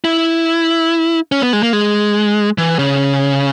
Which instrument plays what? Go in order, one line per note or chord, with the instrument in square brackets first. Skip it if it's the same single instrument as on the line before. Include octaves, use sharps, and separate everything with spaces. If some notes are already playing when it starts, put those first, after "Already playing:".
[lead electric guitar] E4
C#4
B3
G#3
A#3
G#3
E3
C#3